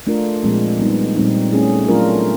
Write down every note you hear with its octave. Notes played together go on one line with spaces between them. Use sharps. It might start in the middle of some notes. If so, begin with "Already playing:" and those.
A3 D4 F4 A#4
A#2 F3 G#3 C4
G3 B3 D#4
A#2 G3 C4 D#4
A3 C#4 E4 G#4
F#3 A3 D4 F4 A#4